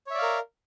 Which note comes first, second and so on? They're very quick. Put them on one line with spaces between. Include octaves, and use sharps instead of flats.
C#5 E5 D5 F5 A#4